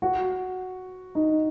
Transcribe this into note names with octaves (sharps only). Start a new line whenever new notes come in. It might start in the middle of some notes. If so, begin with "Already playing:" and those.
F#4
D#4